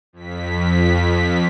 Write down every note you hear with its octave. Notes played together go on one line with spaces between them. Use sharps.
F2 B6